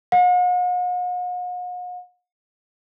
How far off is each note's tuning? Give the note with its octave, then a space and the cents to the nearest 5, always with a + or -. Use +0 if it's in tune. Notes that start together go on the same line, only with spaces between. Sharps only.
F#5 -45